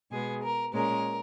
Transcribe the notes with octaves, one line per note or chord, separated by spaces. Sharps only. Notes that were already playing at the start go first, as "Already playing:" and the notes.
B2 G#3 B3 G#4
A#4
A#2 G#3 C#4 A#4